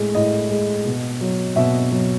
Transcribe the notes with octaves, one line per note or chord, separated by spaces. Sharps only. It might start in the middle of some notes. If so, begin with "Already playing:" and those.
Already playing: A2 G#3
A2 D#5
G#3
B2
F#3
B2 E5
F#3